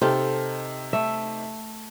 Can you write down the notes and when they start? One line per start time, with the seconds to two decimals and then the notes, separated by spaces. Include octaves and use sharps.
0.01 C3 D#4 G4 A4 C5 F6
0.93 A3 E5